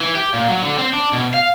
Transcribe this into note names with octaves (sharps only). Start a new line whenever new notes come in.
E3
G4
A#2
F#3
D3
C4
D4
B2
F5